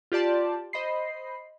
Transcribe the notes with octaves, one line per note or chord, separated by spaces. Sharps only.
F4 G4 D5 A5 C6
C5 D#5 B5 C7